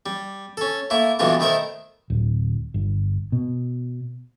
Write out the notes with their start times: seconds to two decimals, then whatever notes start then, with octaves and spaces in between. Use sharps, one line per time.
0.06 G3
0.57 C#4 A4
0.90 A3 A#3 E4
1.19 G2 B2 E3 G3 A3 F4
1.40 D#3 A3 E4 A#4 C5
2.10 D1
2.74 G1
3.32 B2